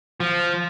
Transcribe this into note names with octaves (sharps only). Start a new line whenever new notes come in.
F3